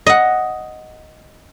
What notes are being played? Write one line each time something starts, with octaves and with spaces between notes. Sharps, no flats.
D#5 F#5